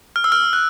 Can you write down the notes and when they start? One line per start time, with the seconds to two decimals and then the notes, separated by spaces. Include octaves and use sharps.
0.16 F6
0.24 E6
0.32 F6
0.53 F#6